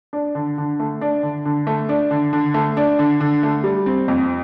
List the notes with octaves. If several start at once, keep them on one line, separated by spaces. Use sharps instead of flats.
D4
D3
D3
A3
D4
D3
D3
A3
D4
D3
D3
A3
D4
D3
D3
A3
G3
C4
F2